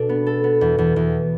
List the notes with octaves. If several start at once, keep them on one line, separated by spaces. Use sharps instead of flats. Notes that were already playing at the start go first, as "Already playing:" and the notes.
Already playing: B2 D4 A4
B3
A4
B3
E2
E2
E2